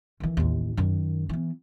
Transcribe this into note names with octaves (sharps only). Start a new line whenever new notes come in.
D#3 E3
A1 D#2
F#2 D#3
E3 B3